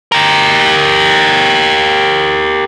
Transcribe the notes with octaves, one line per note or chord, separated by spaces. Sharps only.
G4 A#4